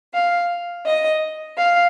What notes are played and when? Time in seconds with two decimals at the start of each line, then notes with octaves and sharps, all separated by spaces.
0.13 F5
0.86 D#5
1.58 F5